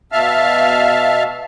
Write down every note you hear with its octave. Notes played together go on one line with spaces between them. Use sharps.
B2 E5 F5 A5 F6